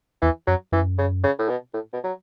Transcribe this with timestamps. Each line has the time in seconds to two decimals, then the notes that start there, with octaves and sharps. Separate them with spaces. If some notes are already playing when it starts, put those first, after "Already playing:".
0.22 E2 E3
0.47 F#2 F#3
0.72 F#2 E3
0.98 C#3
1.24 C#3
1.39 A2
1.49 B2
1.74 A2
1.93 B2
2.04 F#3